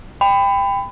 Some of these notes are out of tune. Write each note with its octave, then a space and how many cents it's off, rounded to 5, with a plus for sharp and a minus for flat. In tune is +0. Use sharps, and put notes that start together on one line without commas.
G5 +20 B5 +25